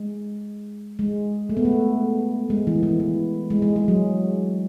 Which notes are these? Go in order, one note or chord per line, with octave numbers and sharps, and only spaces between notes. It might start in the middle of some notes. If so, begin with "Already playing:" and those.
Already playing: G#3
G#3
A3
B3
A3
G#3
E3
E3
E3
G#3
G#3
G#3
F#3